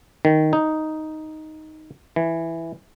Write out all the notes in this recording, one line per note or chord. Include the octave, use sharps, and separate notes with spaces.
D#3
D#4
E3